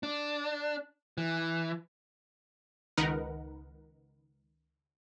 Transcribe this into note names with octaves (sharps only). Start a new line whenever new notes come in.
D4
E3
C#2 D#3 D#4 A#4 B4 F#5